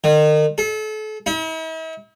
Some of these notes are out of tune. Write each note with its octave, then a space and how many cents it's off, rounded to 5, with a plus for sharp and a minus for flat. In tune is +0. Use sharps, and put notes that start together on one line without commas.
D#3 -35
A4 -35
E4 -45